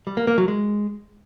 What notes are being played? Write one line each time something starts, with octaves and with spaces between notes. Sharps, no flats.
G3
A#3
A#3
F#3
G#3